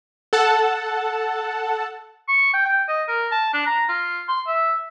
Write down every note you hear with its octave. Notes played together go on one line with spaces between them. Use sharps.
A4 F#5 A5
C#6
G5
G5
D#5
A#4
A5
D4
A#5
F4
C6
E5